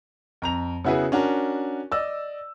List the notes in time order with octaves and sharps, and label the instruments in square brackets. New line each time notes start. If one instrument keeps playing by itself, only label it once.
[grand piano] F2 A#5 F7
C#3 B3 E4 F#4 G#4 B4
C#4 D4 F#4 A#4
D5 D#5 E6